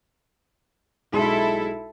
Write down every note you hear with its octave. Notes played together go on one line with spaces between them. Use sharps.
B1 G#3 E4 A4 C6